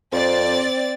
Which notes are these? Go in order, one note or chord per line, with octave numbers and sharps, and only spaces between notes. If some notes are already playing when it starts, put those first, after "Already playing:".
F2 C4 D5 A6